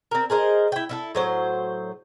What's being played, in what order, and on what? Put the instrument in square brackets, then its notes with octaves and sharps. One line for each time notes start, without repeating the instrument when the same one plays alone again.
[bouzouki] C4 A#4
G#4 A#4 C5 D#5
E4 G5
E4 F4 A4
A2 F#3 C5